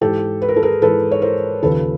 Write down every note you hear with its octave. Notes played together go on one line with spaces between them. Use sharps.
G#2 E3 G4 A4
B4
A#4
A4
G#4 A#4
G#2 E3 A4 B4
C#5
A#4 C5
D#2 C#3 F3 A4 B4